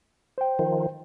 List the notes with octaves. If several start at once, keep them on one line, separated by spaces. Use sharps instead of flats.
C5 G5
D#3 F3